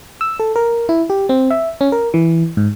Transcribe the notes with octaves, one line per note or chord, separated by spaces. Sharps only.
E6
A4
A#4
E4
G4
C4
E5
C#4
A#4
E3
G#2